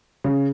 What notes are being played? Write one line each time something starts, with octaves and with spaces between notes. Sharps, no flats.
C#3